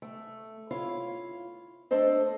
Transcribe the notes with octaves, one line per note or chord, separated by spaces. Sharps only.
A3
E4 F4 C#5 F5
A3 D4 A4 C5 D#5